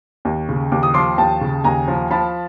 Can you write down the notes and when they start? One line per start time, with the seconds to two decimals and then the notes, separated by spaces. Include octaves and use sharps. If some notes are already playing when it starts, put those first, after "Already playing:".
0.25 D#2
0.49 C#3
0.72 D#2 D6
0.83 D#6
0.94 F3 C6 D6
1.18 D#2 G5 A5
1.41 C#3
1.64 D#2 G#5 A#5
1.88 F3
2.10 F3 A5 B5